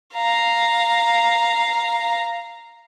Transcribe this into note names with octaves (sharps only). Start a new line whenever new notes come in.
F5 A#5